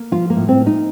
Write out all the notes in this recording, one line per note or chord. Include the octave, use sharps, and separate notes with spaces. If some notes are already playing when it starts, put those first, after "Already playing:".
Already playing: A#3
F3 F4
A#3
A2
C4
A#3
D#4